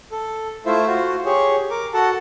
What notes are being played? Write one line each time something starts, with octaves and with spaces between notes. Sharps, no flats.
A4
A3 E4 F4 C5 E5
F4 F#4 C5
G4 G#4 C#5
A#4 D6
F#4 A4 F#5 A5